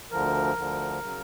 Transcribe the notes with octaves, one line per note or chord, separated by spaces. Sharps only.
D2 D3 F3 A#4
D2 D3 F3
C#3 F#3